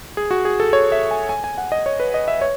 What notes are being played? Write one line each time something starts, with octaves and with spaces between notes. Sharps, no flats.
G#4
F#4
G#4
A4
C#5
E5
G#5
G#5
G#5
F#5
D#5
C#5
B4
D#5
E5
C#5